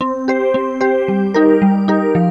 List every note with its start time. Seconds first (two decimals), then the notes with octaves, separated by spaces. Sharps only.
0.01 C4
0.28 G4 C5
0.54 C4
0.81 G4 C5
1.08 G3
1.34 D#4 G4 A#4
1.62 G3
1.88 D#4 G4 A#4
2.15 F3